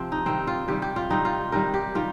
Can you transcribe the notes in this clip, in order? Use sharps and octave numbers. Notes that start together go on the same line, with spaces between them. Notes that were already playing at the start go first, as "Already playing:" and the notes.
Already playing: C3 F3 C4
D#4
C3 D#3 G3 C4
F4
C3 D#3 G3 G4
G4
F4
C3 D#3 G3 D#4
F4
C3 D#3 G3 A#4
G4
D#3 G3 F4